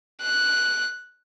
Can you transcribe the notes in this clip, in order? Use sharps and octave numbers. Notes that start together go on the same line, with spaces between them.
F#6